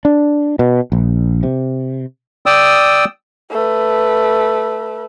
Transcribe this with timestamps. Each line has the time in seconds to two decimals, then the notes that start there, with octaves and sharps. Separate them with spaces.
0.05 D4
0.59 B2
0.92 A#1
1.43 C3
2.46 D5 G5 D#6 E6
3.51 A3 B4